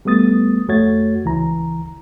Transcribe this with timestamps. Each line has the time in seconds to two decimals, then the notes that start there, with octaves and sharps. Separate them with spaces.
0.05 G3 A3 B3 D#6 A6
0.69 F2 A3 F#4 C#5 G#6 A6
1.25 C#2 E3 A#5